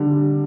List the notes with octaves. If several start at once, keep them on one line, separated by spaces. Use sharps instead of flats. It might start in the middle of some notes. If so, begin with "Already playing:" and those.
Already playing: D3 G3